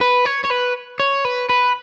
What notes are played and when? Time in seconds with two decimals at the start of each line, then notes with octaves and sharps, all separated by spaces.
0.01 B4
0.26 C#5
0.45 C#5
0.51 B4
1.00 C#5
1.25 B4
1.49 B4